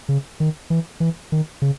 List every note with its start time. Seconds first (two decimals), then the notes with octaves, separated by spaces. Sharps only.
0.09 C#3
0.40 D#3
0.70 E3
1.00 E3
1.32 D#3
1.62 C#3